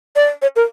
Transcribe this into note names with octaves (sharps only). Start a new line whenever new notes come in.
D5
C#5
A#4